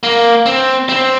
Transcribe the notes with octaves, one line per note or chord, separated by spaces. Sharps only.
A#3
C4
C4